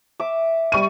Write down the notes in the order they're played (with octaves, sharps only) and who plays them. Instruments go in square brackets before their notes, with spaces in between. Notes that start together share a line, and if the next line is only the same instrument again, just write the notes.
[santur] E5 D6
[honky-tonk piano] G3 C#6 D#7